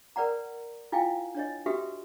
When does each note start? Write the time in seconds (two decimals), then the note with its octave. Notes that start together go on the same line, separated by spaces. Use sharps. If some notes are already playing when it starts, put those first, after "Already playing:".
0.16 A#4 B4 D5 F#5 A#5
0.92 E4 F4 F5 G5 G#5
1.35 D4 C#5 D#5
1.66 F#4 G4 A4 B4 E5